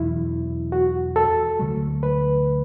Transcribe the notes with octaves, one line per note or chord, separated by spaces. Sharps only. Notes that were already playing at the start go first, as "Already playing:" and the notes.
Already playing: E2 B2 F#3 E4
F#4
A4
D2 D3 F#3 A3
B4